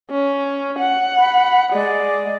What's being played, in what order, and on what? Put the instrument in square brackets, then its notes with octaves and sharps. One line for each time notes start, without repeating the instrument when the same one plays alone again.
[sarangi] C#4
F#5
[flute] B5
[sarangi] G#3 [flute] D5